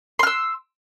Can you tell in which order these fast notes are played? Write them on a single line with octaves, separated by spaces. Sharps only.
C6 F6 E6